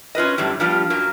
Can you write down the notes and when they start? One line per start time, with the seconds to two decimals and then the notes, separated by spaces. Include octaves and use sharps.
0.15 C#4 F4 B4 D#5
0.38 F#2 A2 D3 G3
0.60 F3 G3 B3 D4 F4 G4
0.90 F#2 F#3 A#3